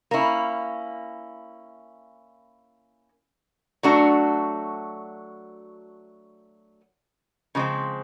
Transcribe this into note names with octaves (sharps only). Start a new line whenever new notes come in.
A#3 C#4 E4
F#3 A3 D4 F#4
C#3 F3 G#3 C4